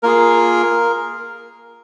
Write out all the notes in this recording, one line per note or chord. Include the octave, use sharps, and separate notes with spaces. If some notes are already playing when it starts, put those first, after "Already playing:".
A#3 F4 G#4 A#4